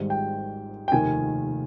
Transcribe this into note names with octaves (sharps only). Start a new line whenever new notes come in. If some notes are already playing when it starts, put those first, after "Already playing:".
Already playing: G#1 G#2 G3
G5
G5
F1 D#2 D#3 G#5